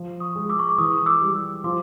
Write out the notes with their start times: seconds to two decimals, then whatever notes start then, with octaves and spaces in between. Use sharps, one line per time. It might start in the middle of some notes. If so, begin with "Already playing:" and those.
Already playing: F3
0.20 C#6 D#6
0.35 G#3
0.49 D6 E6
0.59 C#6
0.69 D6
0.78 E3 C#6 D#6
1.06 D6 E6
1.22 G3
1.64 F3 C6 D6